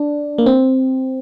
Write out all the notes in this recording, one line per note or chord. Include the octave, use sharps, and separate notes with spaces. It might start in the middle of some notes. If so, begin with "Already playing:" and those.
Already playing: D4
A#3
C4